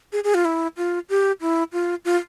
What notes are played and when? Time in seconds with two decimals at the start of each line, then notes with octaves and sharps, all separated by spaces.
0.13 G#4
0.24 G#4
0.34 F4
0.45 E4
0.77 F4
1.09 G4
1.41 E4
1.73 F4
2.05 F4